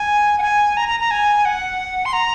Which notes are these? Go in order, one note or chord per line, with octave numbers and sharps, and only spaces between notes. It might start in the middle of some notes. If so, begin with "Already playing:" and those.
Already playing: G#5
F#5
G#5
A#5
A#5
A#5
G#5
F#5
C6
A#5